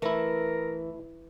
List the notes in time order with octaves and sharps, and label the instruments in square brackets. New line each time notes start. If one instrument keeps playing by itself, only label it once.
[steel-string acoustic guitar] E3 [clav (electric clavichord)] A3 E4 [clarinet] A#4